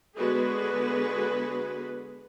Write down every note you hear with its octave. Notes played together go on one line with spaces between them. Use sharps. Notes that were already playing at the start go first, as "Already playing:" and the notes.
D3 G#3 B3 F#4 G#4 B4